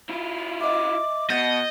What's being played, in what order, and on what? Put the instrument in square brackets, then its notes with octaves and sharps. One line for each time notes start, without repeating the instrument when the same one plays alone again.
[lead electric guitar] E4 F4
[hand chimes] D#5 E5 [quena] D6
[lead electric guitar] B2 [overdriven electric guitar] D#5 [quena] F#5 [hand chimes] G6 A6